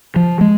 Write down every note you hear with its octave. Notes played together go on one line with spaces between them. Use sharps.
F3
G#3